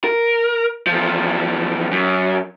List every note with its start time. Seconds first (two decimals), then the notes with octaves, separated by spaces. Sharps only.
0.04 A#4
0.87 E2 F3
1.91 F#2